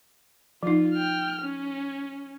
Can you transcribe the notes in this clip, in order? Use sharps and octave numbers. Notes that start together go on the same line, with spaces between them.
F3 D#4 F4
G5 F6
C#4